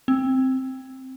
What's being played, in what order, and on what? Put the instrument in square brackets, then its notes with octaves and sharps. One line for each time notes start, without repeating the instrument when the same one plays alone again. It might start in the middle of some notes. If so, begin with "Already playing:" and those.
[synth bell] C4